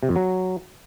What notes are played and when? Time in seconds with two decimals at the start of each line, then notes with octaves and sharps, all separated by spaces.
0.03 C3
0.09 F2
0.16 F#3